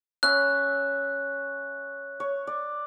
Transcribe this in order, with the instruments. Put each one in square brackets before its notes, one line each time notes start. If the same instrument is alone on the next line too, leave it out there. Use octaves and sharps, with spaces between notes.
[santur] C#4 E5 B5 [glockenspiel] F#6
[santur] C#5
D5